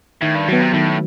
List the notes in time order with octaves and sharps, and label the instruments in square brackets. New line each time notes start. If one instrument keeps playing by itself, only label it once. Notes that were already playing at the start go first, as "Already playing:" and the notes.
[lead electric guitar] A2 [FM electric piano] D#3
[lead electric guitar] G2
[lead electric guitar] A2 [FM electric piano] F#3 B3
[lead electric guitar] C3
[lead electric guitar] A2 [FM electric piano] D#3